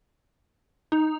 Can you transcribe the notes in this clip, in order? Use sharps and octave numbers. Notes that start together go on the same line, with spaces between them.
D#4